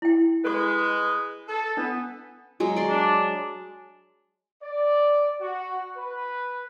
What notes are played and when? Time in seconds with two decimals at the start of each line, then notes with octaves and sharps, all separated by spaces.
0.02 E4 G5
0.44 G#3 A4 B4 C#6 D#6
1.48 A4
1.77 B3 D4
2.60 F#3 G#3
2.76 D5 C6
2.89 D4
4.62 D5
5.41 F#4
5.97 B4